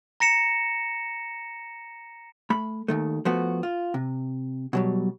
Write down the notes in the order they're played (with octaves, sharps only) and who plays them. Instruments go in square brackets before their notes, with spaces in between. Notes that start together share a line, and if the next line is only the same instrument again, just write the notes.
[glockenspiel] A#5 A#6 C#7 E7
[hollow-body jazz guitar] A3 B5
D#2 D#3 A3
F3 A3 B3 F#4
F4
C3
B2 F#3 G3